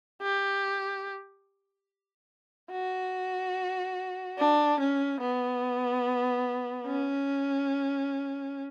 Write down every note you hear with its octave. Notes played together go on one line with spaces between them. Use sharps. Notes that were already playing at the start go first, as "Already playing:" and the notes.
G4
F#4
D4
C#4
B3
C#4